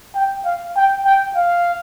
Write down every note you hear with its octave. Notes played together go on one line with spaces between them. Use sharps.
G5
F5
G5
G5
F5